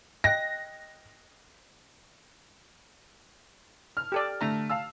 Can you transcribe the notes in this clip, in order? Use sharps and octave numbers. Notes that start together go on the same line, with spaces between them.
D#5 G5 F#6 A#6
F6
G4 A4 D5
D3 A3 A#5
F5 A5 E6